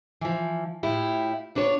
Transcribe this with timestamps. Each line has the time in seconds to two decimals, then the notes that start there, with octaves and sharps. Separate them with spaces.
0.21 E3 F3
0.83 A2 E4 F4 G4
1.55 B3 D4 F4 B4 C#5